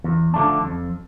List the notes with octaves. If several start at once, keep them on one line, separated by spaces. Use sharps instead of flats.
E2
D3 F3 A3 D4
F2